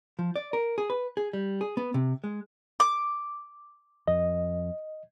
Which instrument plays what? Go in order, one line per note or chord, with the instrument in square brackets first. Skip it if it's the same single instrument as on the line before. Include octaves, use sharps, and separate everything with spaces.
[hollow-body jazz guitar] F3
D5
A#4
G#4
B4
G#4
G3
G#4
B3
C3
G#3
[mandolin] D6
[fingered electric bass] F2 [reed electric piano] D#5